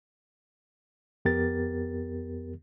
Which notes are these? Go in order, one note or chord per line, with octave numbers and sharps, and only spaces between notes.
F2 B3 G4 A#4 A6